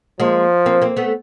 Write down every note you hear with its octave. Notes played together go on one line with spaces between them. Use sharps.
F3 G#3 A#3
A#3 C4
A#3 C4
A3 B3